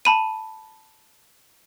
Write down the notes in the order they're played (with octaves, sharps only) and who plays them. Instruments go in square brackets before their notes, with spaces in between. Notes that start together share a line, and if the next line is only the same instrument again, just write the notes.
[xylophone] A5 B5 D#7